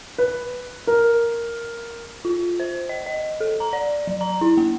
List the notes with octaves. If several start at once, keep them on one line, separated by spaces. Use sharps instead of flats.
B4
A#4
F4
C5
D#5
D#5
A4
A#5
D5
F#3
A#5
E4
A#3